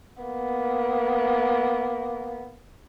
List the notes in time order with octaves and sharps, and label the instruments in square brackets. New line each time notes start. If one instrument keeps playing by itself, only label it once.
[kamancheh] A#3 B3